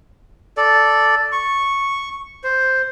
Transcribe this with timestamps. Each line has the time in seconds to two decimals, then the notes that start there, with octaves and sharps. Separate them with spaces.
0.57 A4 D5
1.32 C#6
2.44 C5